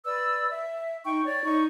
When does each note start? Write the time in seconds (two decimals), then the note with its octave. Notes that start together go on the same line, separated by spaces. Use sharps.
0.05 B4 D5 E6
0.49 E5
1.04 D#4 G5 C#6
1.24 C#5 D5
1.44 D#4 C#6